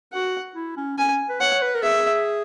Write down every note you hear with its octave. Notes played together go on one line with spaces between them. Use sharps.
F#4 F#5
E4
C#4
C#4 G#5
B4
C#5 F#5
B4
A#4
G#4 E5